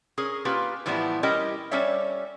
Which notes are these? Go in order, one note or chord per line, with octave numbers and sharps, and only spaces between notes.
C#4 G#4 A#4
A#3 C#4 F4 G4 B4
A2 E3 F3 G3 B3 E4
G3 C#4 E4 G4 A#4 D#5
G3 C#4 A4 C#5 E5